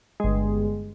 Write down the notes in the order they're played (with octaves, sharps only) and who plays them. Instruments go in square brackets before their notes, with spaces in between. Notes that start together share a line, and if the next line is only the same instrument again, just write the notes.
[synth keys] G1 G#3